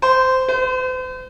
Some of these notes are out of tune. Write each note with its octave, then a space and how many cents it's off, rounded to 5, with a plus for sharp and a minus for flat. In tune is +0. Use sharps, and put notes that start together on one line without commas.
C5 -15
C5 -45